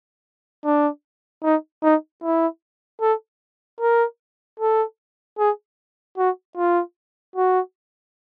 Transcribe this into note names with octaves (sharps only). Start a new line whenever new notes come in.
D4
D#4
D#4
E4
A4
A#4
A4
G#4
F#4
F4
F#4